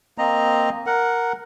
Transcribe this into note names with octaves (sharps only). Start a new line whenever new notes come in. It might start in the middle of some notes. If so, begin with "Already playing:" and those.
A#3 C4 D#5 A#5
A#4 F#5